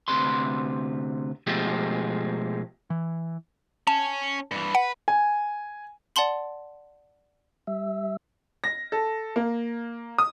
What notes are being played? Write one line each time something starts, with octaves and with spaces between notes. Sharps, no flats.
D2 C3 B4 C6
B2 F3 G#3 A3 G4
E3
C#4 A5
G2 E3
B4 F#5
G#5
D5 F#5 A5 C6 F#7
G3 E5
A#6
A4
A#3
D#6